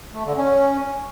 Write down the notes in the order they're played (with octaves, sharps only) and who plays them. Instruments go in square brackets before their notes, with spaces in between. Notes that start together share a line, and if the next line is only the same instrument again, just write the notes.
[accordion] A3
D3
C#4